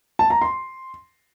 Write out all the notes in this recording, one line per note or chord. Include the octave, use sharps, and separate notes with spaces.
A5
A#5
C6